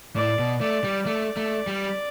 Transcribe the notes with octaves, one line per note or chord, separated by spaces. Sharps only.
A2 D5
B2
A3 D5
G3
A3 D5
A3
G3